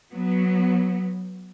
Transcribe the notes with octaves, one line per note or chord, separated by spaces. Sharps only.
F#3 B3